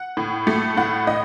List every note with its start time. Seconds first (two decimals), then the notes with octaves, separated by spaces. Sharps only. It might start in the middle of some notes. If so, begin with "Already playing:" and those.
Already playing: F#5
0.17 A2
0.47 A3
0.77 A2 F#5
1.07 A2 D#5